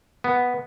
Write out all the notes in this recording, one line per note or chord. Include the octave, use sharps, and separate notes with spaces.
B3